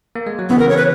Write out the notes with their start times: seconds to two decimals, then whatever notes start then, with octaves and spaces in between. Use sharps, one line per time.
0.15 A#3
0.26 G#3
0.39 F#3
0.49 C#3 E3 B3
0.59 A#4
0.69 C#5
0.77 B4